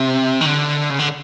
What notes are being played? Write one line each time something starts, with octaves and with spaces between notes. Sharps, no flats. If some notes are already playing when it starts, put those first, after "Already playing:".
Already playing: C3
D#3
D3
C#3
D3